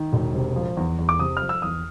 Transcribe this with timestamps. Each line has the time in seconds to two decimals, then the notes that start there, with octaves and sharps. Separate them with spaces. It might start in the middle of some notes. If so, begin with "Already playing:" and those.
Already playing: D#3
0.13 E1
0.34 C3
0.56 F3
0.77 E2
0.99 E2
1.09 D6
1.19 C3 D#6
1.37 F6
1.42 F3
1.49 E6
1.62 E2 D#6